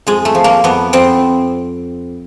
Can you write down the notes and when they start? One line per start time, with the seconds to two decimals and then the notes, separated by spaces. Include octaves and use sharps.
0.07 F2 G#3
0.25 A3
0.35 F3
0.44 A#3
0.64 F2 B3
0.93 F2 C4